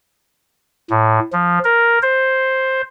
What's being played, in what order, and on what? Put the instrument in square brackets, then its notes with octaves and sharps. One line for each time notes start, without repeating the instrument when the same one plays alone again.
[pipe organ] A2
F3
A#4
C5